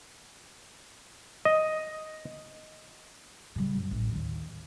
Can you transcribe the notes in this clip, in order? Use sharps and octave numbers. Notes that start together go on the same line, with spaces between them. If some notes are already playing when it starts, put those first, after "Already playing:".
D#5
C#3 G3
F#2
A1
D#2 D#3